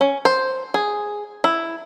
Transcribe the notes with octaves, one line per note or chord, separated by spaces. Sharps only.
C#4
C5
G#4
E4